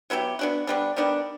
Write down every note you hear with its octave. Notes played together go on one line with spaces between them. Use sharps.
F#3 B3 E4 G4
B3 D4 F#4
D3 G3 B3 D4
D#3 G3 B3 D4